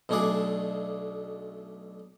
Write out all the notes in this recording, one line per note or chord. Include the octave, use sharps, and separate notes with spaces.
B1 B2 A3 D4 G#4 D5